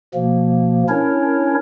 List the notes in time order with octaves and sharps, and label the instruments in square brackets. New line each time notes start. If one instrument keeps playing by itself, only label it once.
[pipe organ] B2 F3 A#3
C#4 D4 E4 A#4 C#5